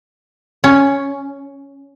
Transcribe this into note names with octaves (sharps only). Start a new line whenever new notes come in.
C#4